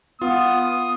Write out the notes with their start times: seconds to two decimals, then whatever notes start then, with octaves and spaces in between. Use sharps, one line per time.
0.22 B3 F4 D#6